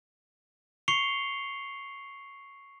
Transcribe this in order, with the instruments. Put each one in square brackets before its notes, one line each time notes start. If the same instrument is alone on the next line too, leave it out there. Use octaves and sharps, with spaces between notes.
[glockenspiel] C#6 C7 C#7 F7 G7